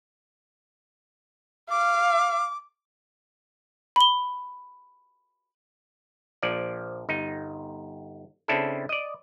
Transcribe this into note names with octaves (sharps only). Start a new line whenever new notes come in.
F5 D6
B5 G7
A#1 F3 D5
G1 D#4
C#3 C4 D4 E4 A4
D5 D#5